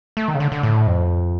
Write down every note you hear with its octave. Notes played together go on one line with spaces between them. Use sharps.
A3
D#3
C#3
D3
D3
A2
F2